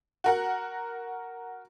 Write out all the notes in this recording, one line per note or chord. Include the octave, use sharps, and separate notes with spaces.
F#4 A#4 F#5